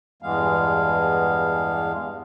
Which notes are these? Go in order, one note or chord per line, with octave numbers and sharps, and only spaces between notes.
E2 G2 E3 G#3 B3 F5